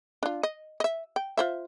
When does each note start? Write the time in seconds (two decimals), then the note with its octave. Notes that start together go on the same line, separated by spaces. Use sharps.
0.23 D4 F4
0.43 D#5
0.80 D#5 E5
1.16 G5
1.37 F4 C5 E5